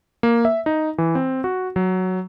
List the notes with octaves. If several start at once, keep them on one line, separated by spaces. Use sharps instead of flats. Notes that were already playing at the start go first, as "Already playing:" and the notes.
A#3
E5
D#4
E3
C4
F#4
F#3